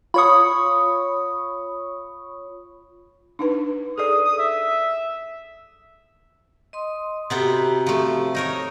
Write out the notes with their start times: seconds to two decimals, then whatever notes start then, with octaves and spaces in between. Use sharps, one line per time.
0.14 F4 C#5 B5 C#6 D#6
3.39 D4 D#4 B4
3.98 G#4 A4 D5 D#6
4.25 D#6
4.39 E5
6.73 D#5 C6 D#6
7.30 C3 B3 F#4 G4 A4 A#5
7.86 F3 A3
8.35 D#4 A#4 C#5